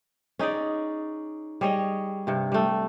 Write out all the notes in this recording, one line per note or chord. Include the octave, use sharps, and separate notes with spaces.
C#4 D#4 G#4 D5
G3 G#4 C#5 D#5
G2 C3
G3 A3